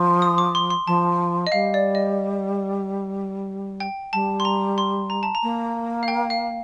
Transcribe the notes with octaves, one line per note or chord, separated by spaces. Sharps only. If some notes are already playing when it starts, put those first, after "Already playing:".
Already playing: F3
D#6
D6
C6
C6
F3 A5
D#5
G3 F5
D5
D#5
G5
G3 A5
C6
A#5
C6
A#5
A5
A#5
A#3
F5
G5
F5